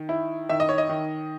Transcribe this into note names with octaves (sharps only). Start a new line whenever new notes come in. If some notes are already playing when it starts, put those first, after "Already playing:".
Already playing: D#3
E4
D#3 E5
D#5
C#5
D#5
D#3